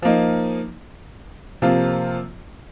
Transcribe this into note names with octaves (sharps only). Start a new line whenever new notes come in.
F3 A#3 D#4
C3 F3 A#3 F4